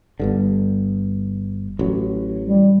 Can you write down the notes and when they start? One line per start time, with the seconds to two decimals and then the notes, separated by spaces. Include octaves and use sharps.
0.20 G1 G2 D3
1.79 A1 F#3
2.43 G3